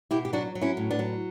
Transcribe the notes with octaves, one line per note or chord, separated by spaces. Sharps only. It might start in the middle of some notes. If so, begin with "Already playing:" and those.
B2 E4 G4
G4
F#3 D4 F#4
F#3
C#4 E4
A2
B3 D4
F#3